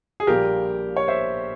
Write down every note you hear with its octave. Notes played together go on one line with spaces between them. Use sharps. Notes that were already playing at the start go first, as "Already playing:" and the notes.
G#4
A#1 A#2 G3 A#3 G4 A#4
C#5
C5 E5